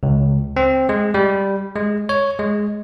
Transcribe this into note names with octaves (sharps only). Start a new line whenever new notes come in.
C#2
C4
G#3
G3
G#3
C#5
G#3